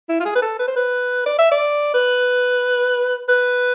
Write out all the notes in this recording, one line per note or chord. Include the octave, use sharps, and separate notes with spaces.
E4
F4
G#4
B4
A4
B4
C5
B4
D5
E5
D5
B4
B4